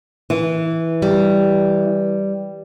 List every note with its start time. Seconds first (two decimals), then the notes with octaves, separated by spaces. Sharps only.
0.30 E3
1.02 G3